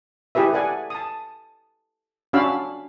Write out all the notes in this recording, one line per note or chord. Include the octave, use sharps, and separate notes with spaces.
E4 G4 G#4 B4 E5
A4 D5 F#5 G#5
A5 D#6
C#4 D4 F#4 F5 B5 E6